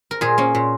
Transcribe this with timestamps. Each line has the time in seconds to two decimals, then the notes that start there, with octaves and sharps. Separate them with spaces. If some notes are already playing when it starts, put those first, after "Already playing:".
0.11 A#4
0.21 A#2 G#4
0.38 A#3 C#4
0.55 A#2